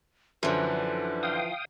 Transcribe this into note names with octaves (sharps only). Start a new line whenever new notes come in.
F#2 D3 E3 F3 B4
F5 G5 D#6